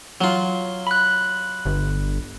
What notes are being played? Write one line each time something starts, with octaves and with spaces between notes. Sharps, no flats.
F#3 F4
B5 F#6
G1